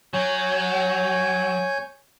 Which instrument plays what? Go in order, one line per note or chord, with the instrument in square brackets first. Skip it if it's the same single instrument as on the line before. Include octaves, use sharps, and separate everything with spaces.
[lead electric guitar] F#3 [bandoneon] C#5 G#5 G6